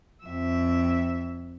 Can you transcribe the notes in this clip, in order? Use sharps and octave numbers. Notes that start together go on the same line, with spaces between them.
F2 E5